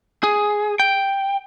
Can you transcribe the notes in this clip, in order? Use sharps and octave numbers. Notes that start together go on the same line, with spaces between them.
G#4
G5